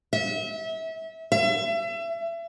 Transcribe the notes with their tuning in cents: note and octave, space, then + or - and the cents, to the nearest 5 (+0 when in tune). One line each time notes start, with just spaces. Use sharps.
E5 -30
E5 +30